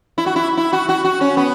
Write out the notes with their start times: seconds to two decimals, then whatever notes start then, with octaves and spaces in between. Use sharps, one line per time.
0.18 E4
0.26 F#4
0.36 E4
0.57 E4
0.73 F#4
0.89 F#4
1.04 F#4
1.21 C#4
1.37 B3